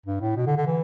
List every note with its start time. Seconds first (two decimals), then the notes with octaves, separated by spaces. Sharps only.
0.06 G2
0.21 A2
0.36 B2
0.47 D3
0.57 D3
0.67 E3